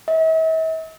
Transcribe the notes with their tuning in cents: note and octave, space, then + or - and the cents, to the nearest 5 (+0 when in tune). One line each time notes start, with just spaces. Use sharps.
E5 -45